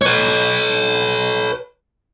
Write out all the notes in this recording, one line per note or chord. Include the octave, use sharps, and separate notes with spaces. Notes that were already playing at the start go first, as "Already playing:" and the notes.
B4 C#5